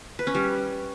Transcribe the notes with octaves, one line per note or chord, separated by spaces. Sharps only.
B4
C#4
G3